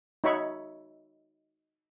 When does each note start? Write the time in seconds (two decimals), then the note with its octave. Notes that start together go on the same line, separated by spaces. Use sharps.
0.24 D#4 F#4 C#5 E5 B5 C#6